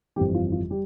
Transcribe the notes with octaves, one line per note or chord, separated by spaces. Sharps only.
G1 F2 E3 G3 G4
F4
F4
G3 G4